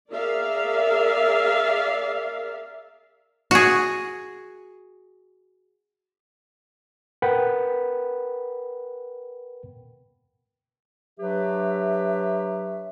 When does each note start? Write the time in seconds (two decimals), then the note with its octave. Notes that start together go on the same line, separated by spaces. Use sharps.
0.10 G#4 A#4 D5 E5 F5
3.51 F#4 G#4
7.22 A#4 B4 F#5 G5 B5
11.18 F#3 D4 G4 B4 E5